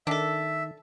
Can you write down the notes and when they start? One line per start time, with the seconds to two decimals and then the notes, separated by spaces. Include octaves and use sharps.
0.07 D#3 D4 A4 E5